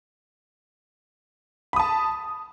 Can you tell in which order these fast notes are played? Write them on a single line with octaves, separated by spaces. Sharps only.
B5 D#6 A5